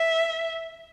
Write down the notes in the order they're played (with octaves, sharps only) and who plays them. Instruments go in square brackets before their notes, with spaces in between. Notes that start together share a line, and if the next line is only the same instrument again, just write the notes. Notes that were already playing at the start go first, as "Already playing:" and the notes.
Already playing: [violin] E5